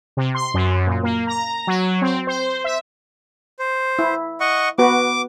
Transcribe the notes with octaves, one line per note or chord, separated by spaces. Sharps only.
C3
C6
F#2
A#2
A#3
A#5
F#3
C4
C5
E5
C5
E4
D#5 F#5 C#6
B3 F#4 B4 D6